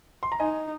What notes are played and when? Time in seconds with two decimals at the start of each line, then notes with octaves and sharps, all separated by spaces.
0.23 C6
0.32 A#5
0.40 D#4 D#5 G#5